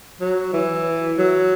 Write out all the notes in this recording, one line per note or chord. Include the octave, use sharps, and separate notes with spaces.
F#3
E3
F#3